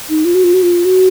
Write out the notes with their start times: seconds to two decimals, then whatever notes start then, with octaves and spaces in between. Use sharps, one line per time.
0.09 D#4
0.25 F4
0.34 F#4
0.44 F4
0.54 F#4
0.63 F4
0.85 F#4